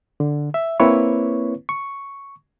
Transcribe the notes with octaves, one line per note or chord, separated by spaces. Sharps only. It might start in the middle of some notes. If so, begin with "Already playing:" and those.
D3
E5
A#3 C4 E4 B4 C#5 C#6
C#6